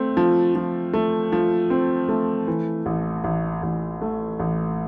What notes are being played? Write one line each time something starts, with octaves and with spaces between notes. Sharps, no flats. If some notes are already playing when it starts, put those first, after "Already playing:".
Already playing: A3 C4
F3
F3
A3
F3
C4
A3
E3
A1
A1
A1
A3
A1